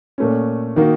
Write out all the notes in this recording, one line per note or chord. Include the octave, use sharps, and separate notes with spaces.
A#2 A3 C#4
D#3 A#3 D#4 F#4